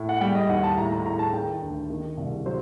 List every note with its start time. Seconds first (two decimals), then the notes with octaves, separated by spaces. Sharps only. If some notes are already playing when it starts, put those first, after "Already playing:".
Already playing: A2
0.09 F#5
0.21 G3 G5
0.35 D#5
0.49 D#2 F#5
0.64 A5
0.77 A2 A#5
0.92 A#5
1.06 A2 A#5
1.19 A5
1.33 D#3 G5
1.62 D2
1.90 D#3
2.17 C2
2.46 F#3 C5